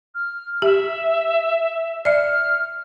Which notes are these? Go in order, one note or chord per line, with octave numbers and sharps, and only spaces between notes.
F6
G4 E5
D5 E5 F6